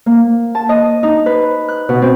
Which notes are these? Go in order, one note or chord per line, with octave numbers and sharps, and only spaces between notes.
A#3
A5
D#5
D#4
B4
F#6
B2
C4